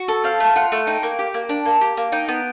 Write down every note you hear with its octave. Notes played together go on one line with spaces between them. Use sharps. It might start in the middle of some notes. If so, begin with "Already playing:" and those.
Already playing: F#4
A4
C4 F5
A3
F4 F#5
A3
D#4 G5
A#3
G4
A#3
D4
A#3
G4
A#3
D#4 G5
B3